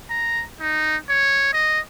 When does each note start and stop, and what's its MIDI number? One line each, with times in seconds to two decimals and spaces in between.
0.10 0.43 82
0.61 0.97 63
1.09 1.49 73
1.54 1.80 75